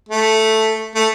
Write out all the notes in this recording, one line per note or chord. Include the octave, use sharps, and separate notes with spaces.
A3
A3